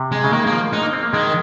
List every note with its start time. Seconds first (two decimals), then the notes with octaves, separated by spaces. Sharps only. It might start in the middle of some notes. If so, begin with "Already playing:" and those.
Already playing: C3
0.12 G#3
0.24 C#3
0.32 D#3 A#3
0.46 A#3
0.52 F3
0.73 G#3 D#4
0.83 A#3
0.93 C4
1.03 A#3
1.13 D#3 G#3